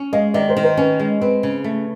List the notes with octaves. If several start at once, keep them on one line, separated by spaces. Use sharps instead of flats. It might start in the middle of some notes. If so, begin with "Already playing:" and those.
Already playing: C#4
G#3 D#5 F5
D#3 D5 E5
A#4 C5
D#3
A#4 C5
C#4 B4
G#3
C4 B4
C#3
A3